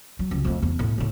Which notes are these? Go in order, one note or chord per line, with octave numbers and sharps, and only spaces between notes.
F#3
C#2
F2 A3
E2
A2
D2 A2